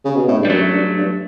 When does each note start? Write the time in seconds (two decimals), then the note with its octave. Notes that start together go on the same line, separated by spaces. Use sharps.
0.05 C#3
0.16 B2
0.28 A2
0.38 G2
0.45 G3
0.50 F#2 F#3 A3
0.73 G2
0.97 G2